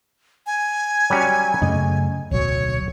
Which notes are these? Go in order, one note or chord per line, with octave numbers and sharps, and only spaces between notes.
G#5
F#3 G3 C#4
F#2 C#3 A3 D#5
D1 B1 F#3 C#5